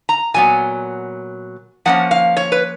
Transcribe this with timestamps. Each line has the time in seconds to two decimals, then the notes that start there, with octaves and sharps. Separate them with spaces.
0.09 A#5
0.34 A#2 F#3 B3 G#5
1.85 F3 A#3 C#4 F#5
2.11 F5
2.37 C#5
2.52 B4